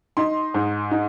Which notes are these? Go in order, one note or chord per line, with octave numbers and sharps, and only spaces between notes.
D#4 C6
G#2
D#4